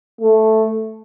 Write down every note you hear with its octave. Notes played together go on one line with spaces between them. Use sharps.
A3